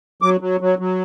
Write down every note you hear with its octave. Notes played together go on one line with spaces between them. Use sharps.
F#3 D6
F#3
F#3
F#3